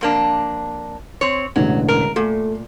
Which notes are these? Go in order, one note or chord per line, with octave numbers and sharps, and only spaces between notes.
F2 A#3 D4
C4 C#5
E1 A1 D3 F#3
A#4
A#2 A3